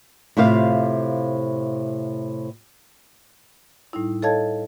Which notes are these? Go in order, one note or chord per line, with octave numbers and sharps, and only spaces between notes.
A2 C3 F4 C5 F5
A2 G3 D#4 E4
A4 C#5 D#5 F5 A5 G#6